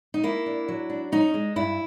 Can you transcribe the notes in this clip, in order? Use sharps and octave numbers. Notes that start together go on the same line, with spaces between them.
D#4
A#3 E4
D4
F#3
D4
C#4 D#4
G#3
G2 E4